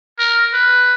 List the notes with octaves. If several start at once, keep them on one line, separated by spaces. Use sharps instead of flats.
A#4
B4